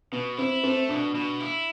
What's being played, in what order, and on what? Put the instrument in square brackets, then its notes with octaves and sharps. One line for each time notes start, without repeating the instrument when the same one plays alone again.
[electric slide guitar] B2 [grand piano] B3
[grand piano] C4 [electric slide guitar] E4
[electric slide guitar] A3 [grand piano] C4
[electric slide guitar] B2 [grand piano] D4
[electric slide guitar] B2
E4